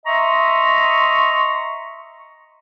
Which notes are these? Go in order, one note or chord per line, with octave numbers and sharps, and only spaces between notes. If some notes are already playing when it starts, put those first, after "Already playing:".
D#5 E5 A#5 C6 C#6